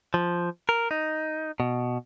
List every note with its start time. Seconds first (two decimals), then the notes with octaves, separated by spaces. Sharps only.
0.14 F3
0.69 A#4
0.91 D#4
1.60 B2